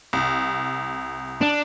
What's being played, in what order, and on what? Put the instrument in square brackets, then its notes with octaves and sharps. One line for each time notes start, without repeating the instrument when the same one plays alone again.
[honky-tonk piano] C2
[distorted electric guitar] D4